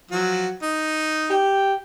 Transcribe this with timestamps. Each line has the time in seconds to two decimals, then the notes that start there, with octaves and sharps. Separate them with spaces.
0.11 F3 F#3 F#4
0.63 D#4
1.31 G4 G5